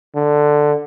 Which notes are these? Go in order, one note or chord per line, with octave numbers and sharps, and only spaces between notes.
D3